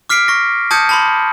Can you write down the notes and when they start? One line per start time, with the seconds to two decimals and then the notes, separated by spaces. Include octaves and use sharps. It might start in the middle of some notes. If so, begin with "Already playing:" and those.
0.09 D6 F6 B6 C7 D7
0.28 C#6 A#6
0.71 A5 D#6 G6 G#6 C#7
0.89 A5 B5 C6